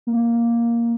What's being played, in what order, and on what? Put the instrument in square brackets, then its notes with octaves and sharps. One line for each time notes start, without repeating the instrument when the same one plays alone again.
[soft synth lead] A#3